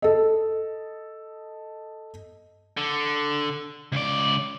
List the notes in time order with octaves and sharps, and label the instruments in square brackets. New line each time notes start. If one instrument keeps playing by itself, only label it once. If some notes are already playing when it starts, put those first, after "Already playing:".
[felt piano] A4 D#5
[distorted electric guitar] D3
C#2 D5